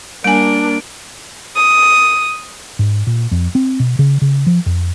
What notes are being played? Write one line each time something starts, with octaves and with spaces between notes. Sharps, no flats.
G3 A#3 D4 G#5 D7
D#6
G#2
A#2
F2
C4
B2
C#3
C#3
F3
F2